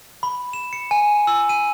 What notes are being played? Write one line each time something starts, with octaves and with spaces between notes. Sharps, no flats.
B5
E7
C#7
G#5
E6
D#7